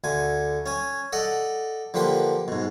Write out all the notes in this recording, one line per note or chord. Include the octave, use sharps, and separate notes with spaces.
D2 D3 G#5
C#4 G#5
A4 D5 D#5 F#5
D3 F3 A#3 G4 B4
G#2 B2